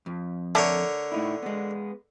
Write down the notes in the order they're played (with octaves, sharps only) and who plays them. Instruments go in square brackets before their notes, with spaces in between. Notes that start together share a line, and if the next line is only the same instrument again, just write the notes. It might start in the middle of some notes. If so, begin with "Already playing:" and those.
[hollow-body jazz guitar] F2
[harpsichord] D3 A#4 C#5 [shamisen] A3
[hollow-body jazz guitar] A2 D#4 E4
G#3 B3